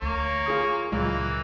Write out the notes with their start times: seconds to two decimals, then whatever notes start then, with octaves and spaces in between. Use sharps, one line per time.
0.02 D2 A#3 C#5
0.46 F4 G#4 D#6
0.92 C#2 A#2 E3 F#3 G#3 A#3 F4